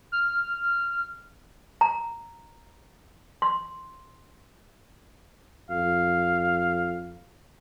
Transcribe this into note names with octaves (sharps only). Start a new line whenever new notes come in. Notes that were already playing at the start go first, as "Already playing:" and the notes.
F6
A#5
C6
F2 F5